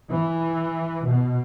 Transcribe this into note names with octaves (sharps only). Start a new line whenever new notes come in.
E3
B2